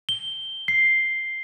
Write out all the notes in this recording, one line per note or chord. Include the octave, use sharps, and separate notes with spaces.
G7
C7